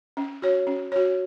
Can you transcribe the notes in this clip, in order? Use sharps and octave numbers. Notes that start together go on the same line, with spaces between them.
C#4
F#4 C#5
C#4
F#4 C#5